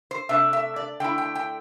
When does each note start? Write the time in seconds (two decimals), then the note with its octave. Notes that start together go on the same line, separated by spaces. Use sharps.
0.11 C5
0.29 C3 A3 D4 E5
0.53 E5
0.76 D5
1.00 D3 A3 E4 G5
1.18 G5
1.35 G5